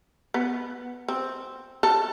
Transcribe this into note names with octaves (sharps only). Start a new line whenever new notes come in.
B3
C4
A4